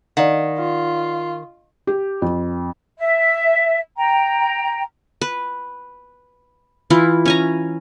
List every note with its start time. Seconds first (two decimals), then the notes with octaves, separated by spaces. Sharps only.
0.17 D#3 D5 F5 F#5
0.58 F4
1.87 G4
2.22 F2
2.98 E5
3.97 G5 A#5
5.21 B4
6.90 E3 E4 F4
7.25 C#4 G#5 A#5